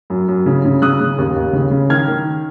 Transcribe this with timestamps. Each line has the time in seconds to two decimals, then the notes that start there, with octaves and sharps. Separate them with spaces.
0.10 F#2
0.28 F#2
0.46 C#3
0.65 C#3
0.82 C#3 D#6 F#6
1.00 C#3
1.18 D#2
1.36 D#2
1.53 C#3
1.71 C#3
1.90 D#3 F6 G#6
2.08 D#3